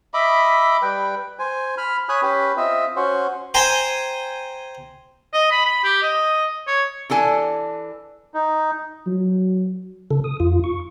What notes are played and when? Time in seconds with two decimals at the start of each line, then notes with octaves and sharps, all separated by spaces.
0.14 D#5 E5 B5 D6
0.82 G3 B4 G5
1.39 C5 G#5
1.78 B5 F6
2.09 C#5 G#5 B5 D#6 F#6
2.23 C#4 G4 B4
2.57 C4 F4 D#5 E5
2.96 C#4 F#4 C5
3.54 C5 G5 G#5 A#5
5.33 D#5
5.51 B5
5.65 B5
5.84 G4
6.03 D#5
6.67 C#5
7.10 E3 D4 A4 G#5
8.34 D#4
9.07 F#3
10.11 C#3 A4
10.24 D#6
10.40 F2 F4
10.64 C#6